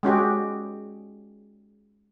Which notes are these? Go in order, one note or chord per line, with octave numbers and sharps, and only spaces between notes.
G#3 C#4 F#4 G4